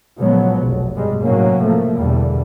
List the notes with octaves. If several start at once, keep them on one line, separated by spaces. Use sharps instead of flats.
A#2 C#3 F3 F#3 G#3 B3
F1 B1
G2 B2 G3 G#3
A2 C3 F#3 A#3 C#4
F3 A3 A#3
E2 B2 D3 G3